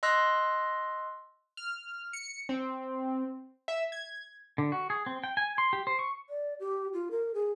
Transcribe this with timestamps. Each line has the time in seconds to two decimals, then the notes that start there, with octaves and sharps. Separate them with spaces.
0.03 D#5 C6 E6 F#6 A#6
1.57 F6
2.13 C#7
2.49 C4
3.68 E5
3.92 G#6
4.58 D3
4.72 F#4
4.90 G#4
5.06 C4
5.24 G5
5.37 G#5
5.58 C6
5.73 G4
5.87 C5
5.99 C#6
6.30 D5
6.60 G4
6.93 F4
7.11 A#4
7.34 G#4